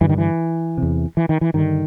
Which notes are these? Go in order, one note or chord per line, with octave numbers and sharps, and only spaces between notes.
G2 D3 E3
D#3
E3
E2 C3
E3
D#3
E3
G2 D3 D#3